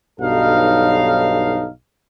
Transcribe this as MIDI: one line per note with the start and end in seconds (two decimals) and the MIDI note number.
0.20 1.68 35
0.20 1.68 43
0.20 1.68 54
0.20 1.68 63
0.20 1.68 69
0.20 1.68 77